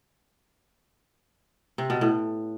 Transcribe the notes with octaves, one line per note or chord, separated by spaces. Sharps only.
C3
B2
A2